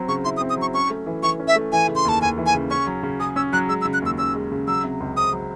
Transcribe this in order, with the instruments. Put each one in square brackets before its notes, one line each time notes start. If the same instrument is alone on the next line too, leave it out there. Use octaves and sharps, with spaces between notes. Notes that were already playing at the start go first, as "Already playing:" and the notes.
Already playing: [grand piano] F#3 C4
[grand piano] C#3 [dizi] C#6
[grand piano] E4 [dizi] C6
[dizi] D#6
[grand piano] C4
[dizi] D#6
[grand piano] F#3 [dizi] C#6
[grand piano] C#4 [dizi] C#6
[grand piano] A3
E3
[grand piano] E3 [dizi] C#6
[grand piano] C#4
[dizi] E5
[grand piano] A3
[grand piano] E3 [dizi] G#5
[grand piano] C#3
[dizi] C6
[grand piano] D#2 [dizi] A5
[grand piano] D#2 [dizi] G#5
[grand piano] E3
[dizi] G#5
[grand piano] C#3
[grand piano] C#4 [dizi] C#6
[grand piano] F#3
C#3
[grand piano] G#4 [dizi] D#6
[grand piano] C#4 [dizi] E6
[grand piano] F#3 [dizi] F#6
[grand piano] G#3 [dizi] E6
[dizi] E6
[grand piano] C#3
[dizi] F#6
[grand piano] D#2 [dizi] E6
[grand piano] C#4 [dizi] E6
[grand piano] G#3
C#3
[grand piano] F#3 [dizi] E6
[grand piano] C3
C#2
[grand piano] C4 [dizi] D#6
[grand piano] F#3